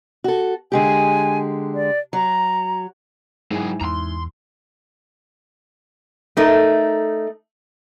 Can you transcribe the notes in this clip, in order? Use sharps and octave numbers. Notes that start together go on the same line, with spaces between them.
F#4 A4
D3 G#3 G4 G#5
D5
F#3 A#5
G#2 F#3 E4 G#4 G#5
E2 A#5 C6
A3 D#4 A#4